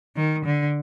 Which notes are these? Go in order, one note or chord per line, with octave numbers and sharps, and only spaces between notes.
D#3
D3